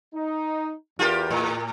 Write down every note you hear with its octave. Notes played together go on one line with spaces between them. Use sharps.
D#4
E2 F4 G4 A#4
A2